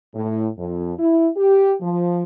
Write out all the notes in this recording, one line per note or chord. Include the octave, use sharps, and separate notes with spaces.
A2
F2
E4
G4
F3